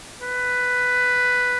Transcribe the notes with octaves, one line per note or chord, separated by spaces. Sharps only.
B4